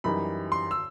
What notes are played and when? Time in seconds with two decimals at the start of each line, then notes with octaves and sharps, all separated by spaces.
0.04 F#2 E3 G3 D#4 B5
0.52 C6
0.71 E6